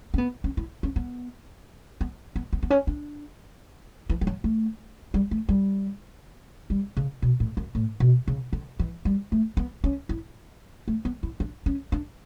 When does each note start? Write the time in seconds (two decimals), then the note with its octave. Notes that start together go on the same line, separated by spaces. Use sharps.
0.14 C#4
0.18 B3
0.44 C#4
0.57 E4
0.83 C#4
0.96 B3
2.01 B3
2.36 B3
2.53 B3
2.63 B3
2.70 C#4
2.87 D4
4.10 E3
4.21 E3
4.27 F#3
4.44 A3
5.14 G3
5.31 A3
5.49 G3
6.70 G3
6.97 C#3
7.22 B2
7.40 A2
7.57 F#2
7.75 A2
8.00 B2
8.28 C#3
8.53 D3
8.79 E3
9.05 G3
9.32 A3
9.57 B3
9.84 C#4
10.09 E4
10.88 A3
11.05 B3
11.23 E4
11.40 D4
11.66 C#4
11.92 D4